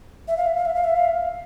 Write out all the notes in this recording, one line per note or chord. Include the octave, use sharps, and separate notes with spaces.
E5
F5
E5
F5
E5
F5
E5
F5